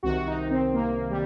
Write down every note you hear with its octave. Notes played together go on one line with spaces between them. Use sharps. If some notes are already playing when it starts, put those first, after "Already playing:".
C2 C3 D#3 F#4
D#4
C4
A#3
G3